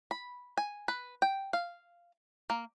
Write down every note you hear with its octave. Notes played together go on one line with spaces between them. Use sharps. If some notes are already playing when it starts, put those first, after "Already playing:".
B5
G#5
B4
G5
F5
A#3